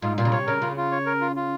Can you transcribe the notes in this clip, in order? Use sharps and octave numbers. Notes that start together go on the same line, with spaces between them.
G#2 F4
A#2 F4
C#3
C3 C#5
C#3 A#4
C#3 F4
F4
C#5
A#4
F4
F4